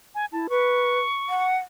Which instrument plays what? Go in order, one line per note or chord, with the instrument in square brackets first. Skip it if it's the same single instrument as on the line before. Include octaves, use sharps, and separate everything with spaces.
[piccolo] G#5
[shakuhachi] E4 [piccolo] A5
[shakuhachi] B4 [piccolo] C#6
[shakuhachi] F#5